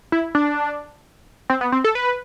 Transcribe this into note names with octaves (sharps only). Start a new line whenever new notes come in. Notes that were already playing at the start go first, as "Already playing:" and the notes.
E4
D4
C4
B3
C4
A4
B4